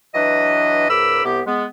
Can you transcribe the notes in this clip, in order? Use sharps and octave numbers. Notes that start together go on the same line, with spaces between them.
E3 F#3 D4 B4 D#5
C#2 G#2 A#4 B5 D6 E6
C2 C3 B3 G4
G#3 B3